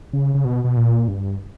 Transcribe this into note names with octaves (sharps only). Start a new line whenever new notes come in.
C#3
C#3
B2
B2
A#2
G2